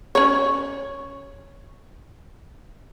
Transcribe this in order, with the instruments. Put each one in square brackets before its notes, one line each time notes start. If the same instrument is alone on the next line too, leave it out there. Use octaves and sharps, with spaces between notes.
[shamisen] C#4 C#5